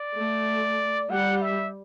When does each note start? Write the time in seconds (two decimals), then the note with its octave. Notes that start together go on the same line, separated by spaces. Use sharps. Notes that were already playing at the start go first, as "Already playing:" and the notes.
Already playing: D5
0.15 A3
1.10 G3 F#5
1.41 E5